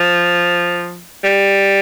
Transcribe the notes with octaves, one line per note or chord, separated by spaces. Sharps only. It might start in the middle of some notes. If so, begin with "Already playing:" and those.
Already playing: F3
G3